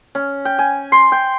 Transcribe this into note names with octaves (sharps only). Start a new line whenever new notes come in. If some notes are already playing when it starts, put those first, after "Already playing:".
C#4
G5
G#5
C6
G5